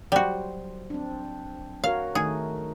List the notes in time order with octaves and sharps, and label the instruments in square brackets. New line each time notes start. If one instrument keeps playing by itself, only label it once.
[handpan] F#3 C5 [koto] G3 F#4
[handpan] C4 D4
[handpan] F#4 A#4 C#5 [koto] F5
[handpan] D#3 A3 D#4 [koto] G#4